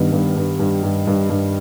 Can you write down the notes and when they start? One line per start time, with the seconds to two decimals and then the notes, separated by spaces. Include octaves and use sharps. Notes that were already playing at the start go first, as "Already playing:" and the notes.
Already playing: G2 D#3 B3
0.12 G2
0.37 G2
0.60 G2
0.83 G2
1.07 G2
1.30 G2